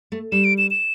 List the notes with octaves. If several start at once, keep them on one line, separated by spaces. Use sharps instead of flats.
A3
G3 E7
D7
E7
E7